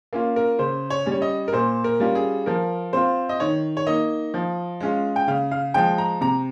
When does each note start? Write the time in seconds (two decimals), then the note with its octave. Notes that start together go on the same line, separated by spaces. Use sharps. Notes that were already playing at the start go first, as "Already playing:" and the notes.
0.13 A#3 C#4 F4
0.36 A#4
0.59 C#3 C5
0.90 C#5
1.06 G3 C#4
1.12 C#5
1.22 D#5
1.48 A#4
1.53 A#2 C5
1.84 A#4
2.00 G3 C#4 F4
2.15 G#4
2.46 F3 A#4
2.93 C4 F4 C5
3.29 D#5
3.40 D#3 C#5
3.77 C#5
3.87 A#3 D#4 D#5
4.34 F3
4.80 G#3 C#4 F4
5.16 G5
5.28 C#3 F5
5.51 F5
5.74 F3 G#3 G5
5.98 A#5
6.21 C3 A#5